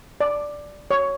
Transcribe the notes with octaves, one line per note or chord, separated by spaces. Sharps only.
D5
C#5